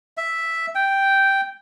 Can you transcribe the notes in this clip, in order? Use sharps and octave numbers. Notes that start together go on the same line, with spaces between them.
E5
G5